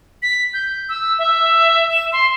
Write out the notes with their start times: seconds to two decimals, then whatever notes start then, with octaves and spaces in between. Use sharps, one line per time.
0.23 B6
0.54 G6
0.89 E6
1.19 E5
1.90 E7
2.13 C6